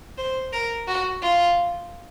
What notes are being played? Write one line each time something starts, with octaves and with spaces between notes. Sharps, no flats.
C5
A#4
F#4
F4